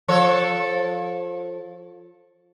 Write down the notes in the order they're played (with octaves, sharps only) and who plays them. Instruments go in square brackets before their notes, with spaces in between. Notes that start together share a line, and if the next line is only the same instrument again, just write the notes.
[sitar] F3 A4 C#5